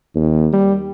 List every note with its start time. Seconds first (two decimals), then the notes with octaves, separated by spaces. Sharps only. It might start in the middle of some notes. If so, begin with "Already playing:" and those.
0.15 D#2
0.53 G3